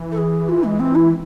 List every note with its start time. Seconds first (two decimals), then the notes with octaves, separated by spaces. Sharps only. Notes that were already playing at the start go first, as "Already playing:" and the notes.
Already playing: E3
0.12 A4
0.18 G#4
0.49 F4
0.64 G#3
0.80 C4
0.95 E4